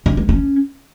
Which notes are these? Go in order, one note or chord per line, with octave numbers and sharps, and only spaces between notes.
D3
G#3
C#4